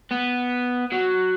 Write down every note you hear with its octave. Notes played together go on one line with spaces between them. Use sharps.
B3
F#3